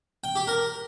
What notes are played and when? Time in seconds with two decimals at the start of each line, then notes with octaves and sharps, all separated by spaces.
0.24 G5
0.36 G4
0.47 A#4